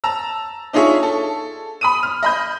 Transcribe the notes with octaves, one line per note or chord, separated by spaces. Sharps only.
A5 A#5 E6
D4 D#4 F4 G#4 C#5 E5
A4
B5 D#6 D#7
F6
D#5 B5 G6